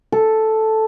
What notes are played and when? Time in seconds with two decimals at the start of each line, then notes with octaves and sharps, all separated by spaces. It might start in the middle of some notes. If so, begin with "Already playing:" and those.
0.12 A4